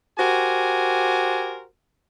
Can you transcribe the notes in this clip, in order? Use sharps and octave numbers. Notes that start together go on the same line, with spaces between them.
F#4 G4 A#4 C5 G#5